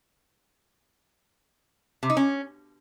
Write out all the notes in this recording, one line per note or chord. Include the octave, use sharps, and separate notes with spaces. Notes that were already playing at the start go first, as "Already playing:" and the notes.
C3
D#4
C#4